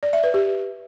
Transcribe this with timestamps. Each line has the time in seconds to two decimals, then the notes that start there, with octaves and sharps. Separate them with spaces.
0.03 D5
0.13 E5
0.24 B4
0.34 G4